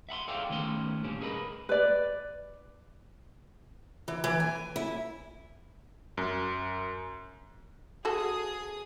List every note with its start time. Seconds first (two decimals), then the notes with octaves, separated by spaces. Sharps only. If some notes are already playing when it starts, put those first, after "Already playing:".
0.09 E5 F#5 B5 C6
0.28 G#4 A4 C#5 D5 F5 G5
0.50 D#3 A3 B3 C#4 C6
1.04 A#2 G3 C#4 D4
1.21 G#4 A#4 B4 D#5 B5
1.69 B4 D5
4.08 E3
4.24 E3
4.40 G#5
4.76 E4
6.17 F#2
8.05 F#4 G#4 A4 D#6